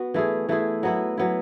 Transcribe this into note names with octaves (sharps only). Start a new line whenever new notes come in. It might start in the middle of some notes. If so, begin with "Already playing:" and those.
Already playing: B3 F#4
E3 A3 E4 G#4
E3 A3 E4 G#4
F#3 B3 E4
F#3 B3 E4